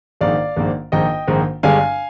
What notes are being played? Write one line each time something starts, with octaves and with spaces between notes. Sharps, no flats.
A#1 G#2 D#3 A#3 D5 F5
A#1 G#2 D#3 A#3
A#1 G#2 D#3 A#3 D#5 G5
A#1 G#2 D#3 A#3
G1 G2 D3 G#3 D4 F5 G#5